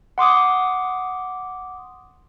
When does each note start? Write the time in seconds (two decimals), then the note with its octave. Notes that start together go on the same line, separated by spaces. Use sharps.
0.18 F#5 C6 D6 D#6